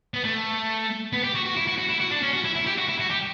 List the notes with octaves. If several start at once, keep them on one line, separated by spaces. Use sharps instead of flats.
B3
A3
B3
G4
F#4
F#4
E4
F#4
F#4
E4
F#4
D4
C#4
F#4
E4
E4
G4
F#4
E4
F#4
G4